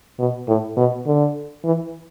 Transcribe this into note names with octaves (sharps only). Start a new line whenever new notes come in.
B2
A2
B2
D3
E3